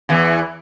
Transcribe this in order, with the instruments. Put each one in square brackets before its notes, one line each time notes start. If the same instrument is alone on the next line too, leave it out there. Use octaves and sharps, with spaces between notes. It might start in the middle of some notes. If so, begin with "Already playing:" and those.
[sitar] E2 E3